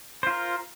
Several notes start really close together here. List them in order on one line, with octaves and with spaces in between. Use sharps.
C5 F4 A#4